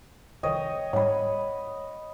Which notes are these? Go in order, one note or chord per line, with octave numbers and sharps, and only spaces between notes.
C2 F2 D#3 C#5 D#5 G5
G#2 G3 C#5 F#5 B5